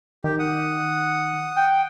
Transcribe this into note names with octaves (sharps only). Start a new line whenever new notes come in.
D#3 G4
F#5 D#6
G5